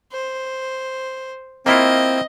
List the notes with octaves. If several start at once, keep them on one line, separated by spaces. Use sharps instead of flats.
C5
A#3 C4 E4 F4 D#5